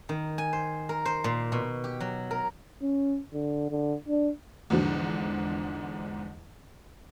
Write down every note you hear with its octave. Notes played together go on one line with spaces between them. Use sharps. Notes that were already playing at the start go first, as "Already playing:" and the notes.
D#3
G#5
C5
A#4
C5
A#2
B2
G4
F#3
A#4
C#4
D3
D3
D4
E2 G#2 D3 F3